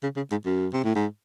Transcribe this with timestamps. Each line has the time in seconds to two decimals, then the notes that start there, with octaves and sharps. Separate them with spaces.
0.03 C#3
0.16 C#3
0.31 G#2
0.45 F#2
0.73 C3
0.84 A2
0.95 G#2